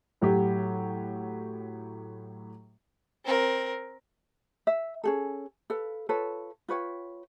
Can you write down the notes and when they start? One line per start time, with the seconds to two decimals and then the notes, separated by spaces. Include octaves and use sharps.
0.21 A2 F#3 F#4 G4
3.25 C4 A#4
4.67 E5
5.04 C#4 G#4 A4
5.70 A4 B4 F5
6.09 F4 A4 B4 C#5
6.68 F4 B4 C#5 G5